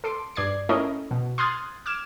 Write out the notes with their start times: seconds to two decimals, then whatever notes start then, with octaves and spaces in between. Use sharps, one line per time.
0.04 A4 C6 D6
0.36 G2 D5 G#6 C7
0.69 A3 C#4 E4 A#4 C#5 D#5
1.11 B2
1.38 C6 D#6 F6 F#6 G#6 A6
1.86 D6 F6 G#6 E7